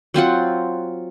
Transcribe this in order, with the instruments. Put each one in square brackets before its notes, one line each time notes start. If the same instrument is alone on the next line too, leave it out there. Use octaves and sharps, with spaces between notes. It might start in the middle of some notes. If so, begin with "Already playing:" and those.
[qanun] F#3 C4 F4 F#5